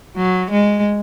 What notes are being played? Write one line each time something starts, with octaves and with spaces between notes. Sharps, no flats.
F#3
G#3